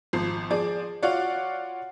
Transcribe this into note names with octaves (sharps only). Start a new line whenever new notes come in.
G#1 F3 C7
F3 G#4 D5
F4 F#4 C#5 D5 F5 F#5